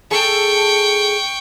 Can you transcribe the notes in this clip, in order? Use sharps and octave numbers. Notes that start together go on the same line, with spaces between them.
G#4 A4 G5 C#6